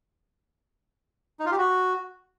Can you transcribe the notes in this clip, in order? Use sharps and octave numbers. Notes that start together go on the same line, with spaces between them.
D#4
F4
G4
F#4